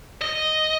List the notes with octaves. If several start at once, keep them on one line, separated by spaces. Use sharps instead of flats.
D#5